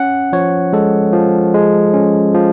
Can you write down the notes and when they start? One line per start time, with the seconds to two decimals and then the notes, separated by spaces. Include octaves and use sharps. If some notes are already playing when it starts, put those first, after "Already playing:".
Already playing: C#4 F#5
0.33 F3 C#5
0.73 G#3 A4
1.13 F3
1.54 G#3
1.94 C#4
2.34 F3